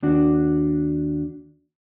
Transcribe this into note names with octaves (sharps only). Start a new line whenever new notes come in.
D#2 D4 F#4